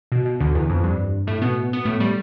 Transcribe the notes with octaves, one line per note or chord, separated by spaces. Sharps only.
B2
B2
D2 D3
E2 E3
F2 F3
G2 G3
A2 A3
B2 B3
B3
A2 A3
G3